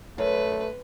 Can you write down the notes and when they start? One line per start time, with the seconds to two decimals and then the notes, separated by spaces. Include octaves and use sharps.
0.18 F#2 A3 B4